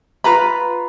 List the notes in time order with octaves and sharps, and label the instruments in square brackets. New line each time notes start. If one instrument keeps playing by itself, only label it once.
[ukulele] F4 B4 A#5 B5